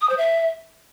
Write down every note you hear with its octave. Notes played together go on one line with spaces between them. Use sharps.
D#6
C5
E5